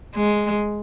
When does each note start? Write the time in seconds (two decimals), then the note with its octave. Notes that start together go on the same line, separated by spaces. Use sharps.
0.16 G#3